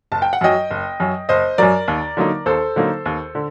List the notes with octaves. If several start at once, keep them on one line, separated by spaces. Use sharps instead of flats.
F#1 A5
G5
F#5
F#2 F#3 D#5 G5
F#1
F#2 F#3
F#1 C5 D#5
F#2 F#3 A#4 D5
D#2
D3 F#3 A#3 D#4
D#2 A4 C5
D3 F#3 A#3 D#4
D#2
D3